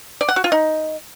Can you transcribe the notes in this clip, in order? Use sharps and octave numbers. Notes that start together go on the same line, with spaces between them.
D5
F#5
F#4
F4
D#4